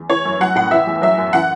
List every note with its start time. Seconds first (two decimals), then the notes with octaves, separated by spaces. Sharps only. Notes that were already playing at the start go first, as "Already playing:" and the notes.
Already playing: E2
0.09 E3 C#5
0.25 F#2
0.40 F#3 F#5
0.55 A2 F#5
0.71 E3 E5
0.87 E2
1.02 F#3 E5
1.18 F#2
1.33 E3 F#5